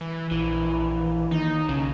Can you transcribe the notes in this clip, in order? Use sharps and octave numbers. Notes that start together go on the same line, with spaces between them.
E3
A#1 E3
D#2 D#4
B1 C#3